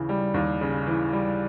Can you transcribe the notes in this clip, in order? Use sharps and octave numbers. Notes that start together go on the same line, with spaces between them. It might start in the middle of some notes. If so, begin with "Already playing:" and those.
Already playing: D#2 C#3 E3
G3
D#2
C#3
E3
G3